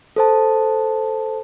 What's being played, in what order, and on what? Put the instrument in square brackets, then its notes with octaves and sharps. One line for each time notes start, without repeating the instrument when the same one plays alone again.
[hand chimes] A4 C5 A5